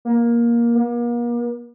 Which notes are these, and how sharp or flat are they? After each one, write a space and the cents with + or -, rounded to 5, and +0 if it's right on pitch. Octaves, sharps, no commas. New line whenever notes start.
A#3 +15
A#3 +40